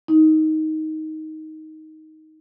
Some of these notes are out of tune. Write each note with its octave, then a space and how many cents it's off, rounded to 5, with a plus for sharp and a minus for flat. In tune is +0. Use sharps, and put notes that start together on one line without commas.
D#4 +10